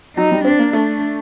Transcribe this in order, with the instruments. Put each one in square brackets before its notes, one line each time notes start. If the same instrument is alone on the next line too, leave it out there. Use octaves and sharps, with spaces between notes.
[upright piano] F#3 [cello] D#4
[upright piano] G3
[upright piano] C4 [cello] D4
[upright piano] A#3
[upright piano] A3 [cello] D4